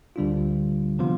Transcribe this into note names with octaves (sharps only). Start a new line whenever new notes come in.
D2 D3 G3 D4 F4
C3 F3 B3 F4